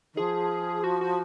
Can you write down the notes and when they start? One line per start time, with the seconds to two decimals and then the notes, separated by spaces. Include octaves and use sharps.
0.13 D#3
0.17 F3 G#4
0.84 F#4
1.01 F#4